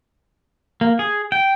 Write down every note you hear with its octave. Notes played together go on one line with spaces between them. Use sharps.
A#3
G#4
G5